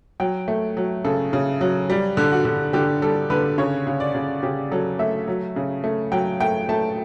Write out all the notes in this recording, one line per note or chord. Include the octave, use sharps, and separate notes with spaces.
F#3 G5
A3
F#3
C#3 A4
C#3
F#3
G3
D3
F#4
D3
D3 G4
G3 A4
D3 B4
C#3 C#5
C#3
D5
C#3
C#3 G4
F#3 A4
A3 E5
F#3
C#3
A3
F#3 G5
A3 G5
A3 A5